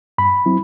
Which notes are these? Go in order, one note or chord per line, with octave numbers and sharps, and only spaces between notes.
G2 B5
F#3 C4 E4